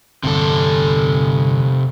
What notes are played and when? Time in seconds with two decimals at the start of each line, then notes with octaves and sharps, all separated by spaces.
0.23 G1 E2 C3 A4